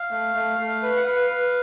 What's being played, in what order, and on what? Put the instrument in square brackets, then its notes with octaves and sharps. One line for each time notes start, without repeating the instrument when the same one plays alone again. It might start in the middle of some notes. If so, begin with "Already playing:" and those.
Already playing: [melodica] F5
[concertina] A3
A3
A3
B4
[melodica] F#5
[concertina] B4 [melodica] F5
[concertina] B4